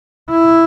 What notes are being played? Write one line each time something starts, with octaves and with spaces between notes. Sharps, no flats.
E4